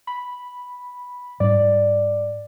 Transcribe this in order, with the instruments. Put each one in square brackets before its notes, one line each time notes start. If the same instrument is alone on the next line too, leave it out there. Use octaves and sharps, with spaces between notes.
[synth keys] B5
[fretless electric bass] G#2 G3 [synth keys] D5